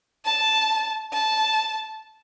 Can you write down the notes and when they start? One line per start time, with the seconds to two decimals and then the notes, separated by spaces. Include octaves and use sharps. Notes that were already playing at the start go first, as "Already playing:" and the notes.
0.26 A5
1.13 A5